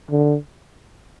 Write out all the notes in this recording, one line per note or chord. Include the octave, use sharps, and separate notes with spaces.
D3